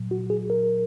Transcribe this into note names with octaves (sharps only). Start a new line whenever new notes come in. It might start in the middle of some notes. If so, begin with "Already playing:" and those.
Already playing: A#2 F#3
F#4
G#4
A#4